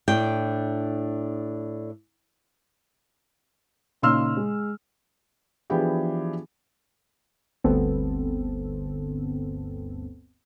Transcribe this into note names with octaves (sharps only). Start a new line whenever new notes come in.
A2 D4 G5
A#2 C#3 D#4 C6 E6 F6
G#3
E3 F3 B3 D4 G4 G#4
G1 D2 D3 B3 C4 A4